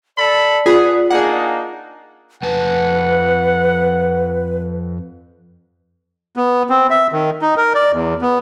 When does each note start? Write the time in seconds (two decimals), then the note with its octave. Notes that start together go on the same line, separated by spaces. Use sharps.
0.18 A4 D5 A5 B5
0.66 B3 F4 G#4
1.10 A#3 D4 D#4 G#4 F#5
2.43 F2 B4 F#5 G#5 A5
6.37 B3
6.70 C4
6.90 E5
7.12 D#3
7.42 D#4
7.57 A#4
7.75 D5
7.93 E2
8.21 B3